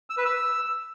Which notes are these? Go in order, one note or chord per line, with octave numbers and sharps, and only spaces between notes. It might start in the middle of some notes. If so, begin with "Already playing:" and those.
E6
B4
E6